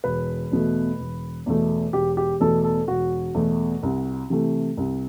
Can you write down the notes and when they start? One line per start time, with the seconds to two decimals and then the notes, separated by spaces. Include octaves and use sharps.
0.04 E1 B4
0.51 E2 B2 A3
0.99 E1
1.46 E2 B2 A3
1.93 E1 G4
2.17 G4
2.40 E2 B2 A3 A4
2.64 A4
2.87 E1 F#4
3.34 E2 B2 A3
3.83 C2
4.30 C3 E3 A3
4.77 C2